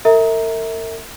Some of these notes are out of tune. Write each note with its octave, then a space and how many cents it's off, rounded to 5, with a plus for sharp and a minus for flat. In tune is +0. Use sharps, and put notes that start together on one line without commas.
A#4 -40 E5 -30 A#5 +0